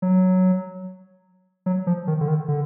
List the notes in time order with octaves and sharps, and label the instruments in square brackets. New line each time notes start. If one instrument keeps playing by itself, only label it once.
[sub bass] F#3
F#3
F3
D#3
D3
D#3
D3